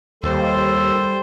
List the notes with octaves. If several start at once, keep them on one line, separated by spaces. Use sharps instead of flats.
D#2 G3 A4 C5